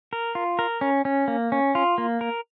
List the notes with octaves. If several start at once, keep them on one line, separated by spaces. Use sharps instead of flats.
A#4
F4
A#4
C#4
C#4
A#3
C#4
F4
A#3
A#4